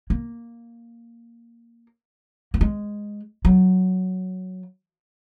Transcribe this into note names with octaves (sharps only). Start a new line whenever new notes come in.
A#3
A#3
G#3
F#3